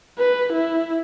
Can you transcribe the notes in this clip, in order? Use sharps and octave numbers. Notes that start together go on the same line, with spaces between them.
B4
E4